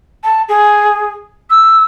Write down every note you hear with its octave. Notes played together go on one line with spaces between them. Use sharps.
A5
G#4
E6